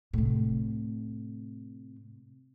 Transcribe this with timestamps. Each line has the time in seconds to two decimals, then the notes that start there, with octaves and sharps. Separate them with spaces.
0.13 A2 C3